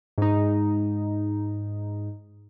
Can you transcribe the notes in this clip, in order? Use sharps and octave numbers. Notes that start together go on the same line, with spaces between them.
G#2 D#4